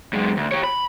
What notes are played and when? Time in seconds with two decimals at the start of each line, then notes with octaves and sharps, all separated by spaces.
0.13 F#2 G#3
0.37 D2
0.51 G4 C#5
0.64 B5